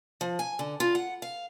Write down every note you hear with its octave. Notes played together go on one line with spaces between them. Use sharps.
F3
G#5
D3
F4
F#5
F5